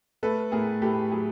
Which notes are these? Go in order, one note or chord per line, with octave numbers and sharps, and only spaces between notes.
A3 A4 B4
A2 G#4 A#4
A2 G4 A4
F#3 G#4